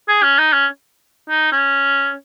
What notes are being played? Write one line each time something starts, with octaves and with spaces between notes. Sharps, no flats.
G#4
C#4
D#4
C#4
D#4
C#4